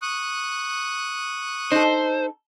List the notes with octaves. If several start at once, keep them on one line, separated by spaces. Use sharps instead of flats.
C#6 D#6 F#6
D#4 A4 C5